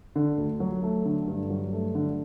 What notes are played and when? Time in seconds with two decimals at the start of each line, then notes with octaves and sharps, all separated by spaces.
0.16 D3
0.37 D2
0.60 F#3
0.83 A3
1.05 D3
1.28 G2
1.50 F#3
1.73 A3
1.95 D3